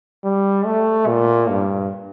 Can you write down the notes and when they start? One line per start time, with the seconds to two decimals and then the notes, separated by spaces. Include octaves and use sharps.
0.24 G3
0.66 A3
1.08 A#2
1.50 G2